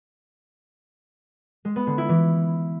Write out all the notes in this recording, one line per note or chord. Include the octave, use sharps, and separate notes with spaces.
G#3
B3
D3
E4
E3